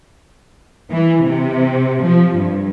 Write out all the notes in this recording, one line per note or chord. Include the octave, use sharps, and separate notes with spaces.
E3
C3
F3
G2